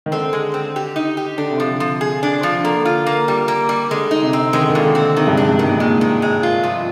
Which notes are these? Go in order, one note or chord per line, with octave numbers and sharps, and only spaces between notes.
D#3
D3 C4
G#3
C4
G4
D#4
G4
D3 D4
C3
D3 F3
F3
G#4
D4
F3
D3 A#3
F4
A#3
G3
A#3
G3
D3 G#3
D#4
C3
C4
D#3 G#3
D3
D#3
A#2
D3
C4
C3 D#3
G2
G#2
D4
G2
G#2 D#3
A#2
G#2 G#3
D#3
G#3
F4
F3